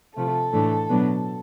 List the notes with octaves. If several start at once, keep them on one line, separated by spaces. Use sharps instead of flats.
C3 F3 A3 A4
A2 E3 A3 D4
B2 F#3 B3 D4